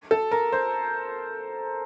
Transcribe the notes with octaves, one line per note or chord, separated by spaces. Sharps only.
A4
A#4
C5